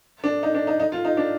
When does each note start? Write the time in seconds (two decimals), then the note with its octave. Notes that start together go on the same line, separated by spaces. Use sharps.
0.24 D4
0.43 D#4
0.54 D4
0.67 D#4
0.80 D#4
0.92 F4
1.05 D#4
1.17 D4